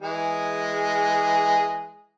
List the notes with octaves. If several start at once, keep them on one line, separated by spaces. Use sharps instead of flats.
E3 G#3 G#4